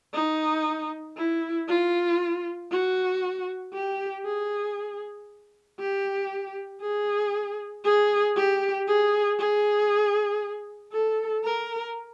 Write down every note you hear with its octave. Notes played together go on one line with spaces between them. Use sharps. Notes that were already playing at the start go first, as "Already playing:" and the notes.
D#4
E4
F4
F#4
G4
G#4
G4
G#4
G#4
G4
G#4
G#4
A4
A#4